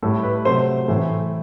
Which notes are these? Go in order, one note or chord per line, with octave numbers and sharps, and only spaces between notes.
A2 G3 A4
B4
C3 F#3 A3 C5
A2 E3 A3